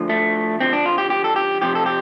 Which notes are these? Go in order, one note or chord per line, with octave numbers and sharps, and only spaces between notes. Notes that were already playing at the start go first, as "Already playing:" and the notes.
Already playing: D2 D3 F3
A3
F2 D3 F3 C4
D4
F4
G4
G4
A4
G4
F2 C3 F3 G4
A4
G4